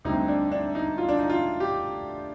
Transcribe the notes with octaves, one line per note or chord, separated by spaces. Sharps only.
D2 D3 G3 C4 D#4
D4
D4
D#4
F4
D4
D#4
F4
G4